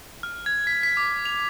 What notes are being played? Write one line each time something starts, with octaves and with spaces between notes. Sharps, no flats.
F6
G#6
B6
B6
D6
F7